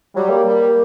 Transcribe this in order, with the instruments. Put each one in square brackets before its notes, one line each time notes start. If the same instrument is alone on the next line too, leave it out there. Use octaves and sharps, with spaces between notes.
[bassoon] F#3 [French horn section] G3
[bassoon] A#3
[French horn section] G3